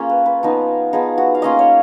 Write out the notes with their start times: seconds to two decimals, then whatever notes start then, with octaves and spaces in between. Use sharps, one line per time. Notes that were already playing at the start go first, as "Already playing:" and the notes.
Already playing: A#3 C#4 F4 G#4
0.09 B4
0.26 B4
0.43 F3 B3 D#4
0.93 F3 B3 D#4 G#4
1.18 F#4
1.35 F5
1.42 A#3 C#4 F4 D#5
1.59 C#5